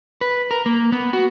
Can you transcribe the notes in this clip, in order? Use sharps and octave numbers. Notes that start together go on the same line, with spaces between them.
B4
A#4
A#3
B3
F#4